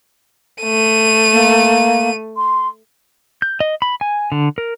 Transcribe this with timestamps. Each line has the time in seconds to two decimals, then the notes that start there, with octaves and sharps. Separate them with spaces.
0.63 A3 D#7
1.32 A#3
2.36 C6
3.42 G6
3.60 D#5
3.82 B5
4.01 G#5
4.32 D3
4.58 A#4